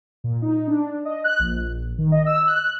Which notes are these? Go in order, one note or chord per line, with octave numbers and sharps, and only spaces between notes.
A#2
D#4
D4
D#5
F#6
A#1
D#3
D#5
E6
F#6